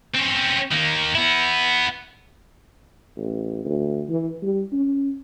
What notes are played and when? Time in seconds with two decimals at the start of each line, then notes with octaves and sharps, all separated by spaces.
0.14 C4 C#4
0.71 D#3 A#3
1.15 B3 E4
3.17 A1
3.65 D2
4.09 E3
4.43 G3
4.73 C#4